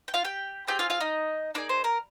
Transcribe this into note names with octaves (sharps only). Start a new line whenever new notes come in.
G5
F4 F5
G4 G5
C4 F4 G4 G#4 G5
F4 F5
F4 F5
D#4 D#5
A#3 D4 D#4 G#4 D5
C5
A#4